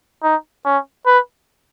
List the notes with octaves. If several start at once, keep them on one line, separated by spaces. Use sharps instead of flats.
D#4
C#4
B4